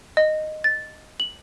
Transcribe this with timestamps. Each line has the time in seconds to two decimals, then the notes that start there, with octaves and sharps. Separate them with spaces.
0.17 D#5
0.64 A6
1.20 F#7